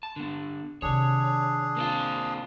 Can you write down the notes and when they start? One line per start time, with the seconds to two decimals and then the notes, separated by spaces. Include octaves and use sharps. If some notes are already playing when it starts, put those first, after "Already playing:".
0.03 A5
0.16 D3 B3
0.82 C3 D#3 D4 G#4 C#5
1.76 A#3 C4 F4